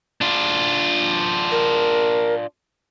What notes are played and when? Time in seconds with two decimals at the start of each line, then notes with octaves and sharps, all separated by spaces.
0.21 D4 F4
1.51 A#4